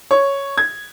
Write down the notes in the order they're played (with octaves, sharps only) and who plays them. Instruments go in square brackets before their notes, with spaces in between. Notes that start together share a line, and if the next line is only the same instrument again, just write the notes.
[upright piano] C#5
G#6